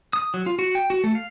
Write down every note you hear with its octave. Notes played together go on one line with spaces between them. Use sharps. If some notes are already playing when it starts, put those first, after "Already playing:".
D#6
F#3
F4
F#4
G5
F#4
A3
F5